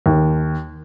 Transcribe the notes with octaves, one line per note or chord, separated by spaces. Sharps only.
D#2